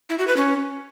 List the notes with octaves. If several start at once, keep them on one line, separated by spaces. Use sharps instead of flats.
E4
F#4
B4
C#4